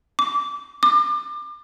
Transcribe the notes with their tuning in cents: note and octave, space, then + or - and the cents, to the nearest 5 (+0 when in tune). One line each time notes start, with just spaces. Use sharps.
D6 -25
D6 +30